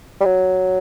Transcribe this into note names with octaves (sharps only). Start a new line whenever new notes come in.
G3
F#3